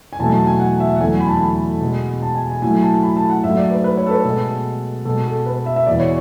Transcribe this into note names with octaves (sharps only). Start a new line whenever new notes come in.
G#5
E2 B2 F#3 A3 A5
A5
G#5
F#5
E5
F#5
E2 D3 F#3 A3 G#5
B5
A5
B5
B2 G#3
A5
G#5
G#5
A2 F#3 A3 G#5
A5
B5
A5
F#5
G#2 F#3 A3 E5
D5
B4
B4
C#5
A4
B4
B2 G#3 A4
B2 G#3 A4
A4
B4
E5
E5
E2 B2 G#3 D5
C#5